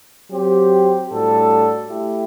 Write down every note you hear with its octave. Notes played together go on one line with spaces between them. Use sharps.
F#3 C4 G4 C5
A2 G3 D4 F#4 A4
A3 E4 G4